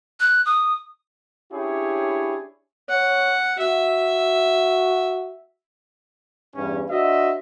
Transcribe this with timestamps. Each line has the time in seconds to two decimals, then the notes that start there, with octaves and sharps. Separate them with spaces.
0.20 F#6
0.46 D#6
1.52 C#4 D4 E4 G4 G#4 C#5
2.89 C#5 F#5
3.59 F#4 E5
6.55 E2 G2 C#4
6.90 D4 F#4 C5 D#5 E5